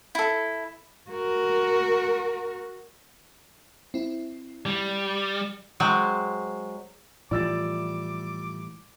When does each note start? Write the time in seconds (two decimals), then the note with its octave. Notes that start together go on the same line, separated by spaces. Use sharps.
0.15 E4 A4
1.11 F#4 A#4
3.94 C4 E4
4.66 G3
5.80 F#3 G#3 C4
7.31 A2 E3 F3 G3 D5 D6 E6 A6